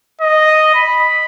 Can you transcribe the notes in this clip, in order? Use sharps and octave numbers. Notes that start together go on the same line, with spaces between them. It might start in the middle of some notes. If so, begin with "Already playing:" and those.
D#5
B5